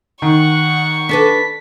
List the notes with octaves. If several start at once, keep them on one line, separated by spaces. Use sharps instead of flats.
D#3 F#5 C#6
D4 A4 B4 B6